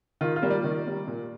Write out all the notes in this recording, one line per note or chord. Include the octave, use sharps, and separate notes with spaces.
D#3 F4
F4
G3 A#3
D5
D#3
G3 A#3
A#2